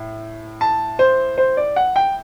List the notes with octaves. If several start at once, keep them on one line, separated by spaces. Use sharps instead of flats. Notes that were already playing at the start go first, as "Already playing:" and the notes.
Already playing: A2
A5
C5
C5
D5
F#5
G5